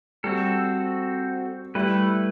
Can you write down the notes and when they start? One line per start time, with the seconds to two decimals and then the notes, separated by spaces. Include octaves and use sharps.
0.24 G3 C4 F#4 A4
1.75 G3 A3 E4 B4